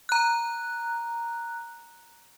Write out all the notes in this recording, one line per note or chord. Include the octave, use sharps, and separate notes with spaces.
A#5 F#6